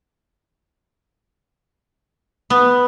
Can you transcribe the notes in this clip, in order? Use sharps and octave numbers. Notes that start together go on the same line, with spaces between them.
B3